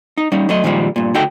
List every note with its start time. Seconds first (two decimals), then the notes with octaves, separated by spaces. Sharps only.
0.18 D#4
0.32 G3 C#4 D#4
0.49 F#3 A3 D#5
0.64 A#2 D#3 F3 G3 G#3
0.96 G2 A#2
1.14 D2 D#4 F#4 A4 G5